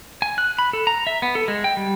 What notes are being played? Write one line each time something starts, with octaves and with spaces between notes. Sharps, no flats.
G#5
F#6
B5
A4
A#5
E5
B3
A4
G#3
G5
G3